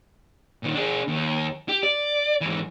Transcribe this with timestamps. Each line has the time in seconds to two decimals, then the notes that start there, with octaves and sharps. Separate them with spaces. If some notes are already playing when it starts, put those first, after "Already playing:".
0.63 A#2 D#3
0.75 D4 G#4
1.08 D#2
1.69 G4
1.83 D5
2.41 G#2 E3